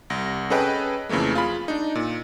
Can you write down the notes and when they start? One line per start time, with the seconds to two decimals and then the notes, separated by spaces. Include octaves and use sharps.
0.10 C2 A#6
0.50 C#4 G#4 A4 B4 D#5 G5
1.09 F2 C#3 E3 A3 A#3
1.35 F4 G#4 B5
1.68 D4 D#4
1.95 A#2